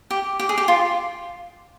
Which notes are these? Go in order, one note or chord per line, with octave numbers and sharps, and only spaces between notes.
G4
G4
G#4
G4
F4